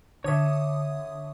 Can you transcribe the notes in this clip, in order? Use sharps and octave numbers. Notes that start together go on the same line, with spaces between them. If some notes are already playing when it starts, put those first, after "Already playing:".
D3 C#5 E5 D#6